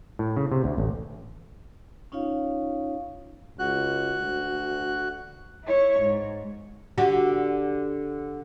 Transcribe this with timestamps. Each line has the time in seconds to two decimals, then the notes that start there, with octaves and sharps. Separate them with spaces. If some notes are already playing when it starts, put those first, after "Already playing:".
0.19 A2
0.37 C#3
0.52 C3
0.64 D2
0.78 A1
2.12 C#4 D#4 F4 C#5 F5
3.59 C#2 F#4 F#6
4.21 D2
5.65 E4 C#5
6.00 G#2
6.98 D3 F#4 G4